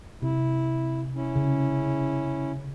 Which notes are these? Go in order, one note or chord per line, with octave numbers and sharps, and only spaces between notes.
C3 E4
C#4 E4
C#3